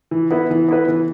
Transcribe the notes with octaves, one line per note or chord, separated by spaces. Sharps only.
E3
B3 E4 B4
E3
B3 E4 B4
E3